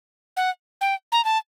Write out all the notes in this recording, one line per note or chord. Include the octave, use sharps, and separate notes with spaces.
F#5
G5
A#5
A5